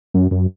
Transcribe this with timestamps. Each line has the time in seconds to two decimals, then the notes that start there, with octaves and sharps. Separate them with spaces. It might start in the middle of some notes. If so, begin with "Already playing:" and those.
0.14 F#2
0.31 F#2